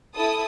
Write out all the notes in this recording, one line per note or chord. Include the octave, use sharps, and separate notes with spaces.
E4 A4 D#6